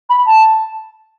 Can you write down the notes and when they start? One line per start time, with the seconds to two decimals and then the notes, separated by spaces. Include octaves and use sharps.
0.09 B5
0.26 A5